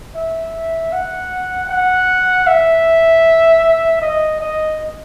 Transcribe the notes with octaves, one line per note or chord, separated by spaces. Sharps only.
E5
F#5
F#5
E5
D#5
D#5